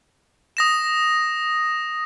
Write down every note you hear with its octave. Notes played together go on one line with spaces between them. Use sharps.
D#6 A#6 E7